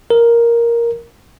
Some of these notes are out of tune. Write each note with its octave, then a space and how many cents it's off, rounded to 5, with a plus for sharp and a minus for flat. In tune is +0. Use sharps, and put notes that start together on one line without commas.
A#4 +5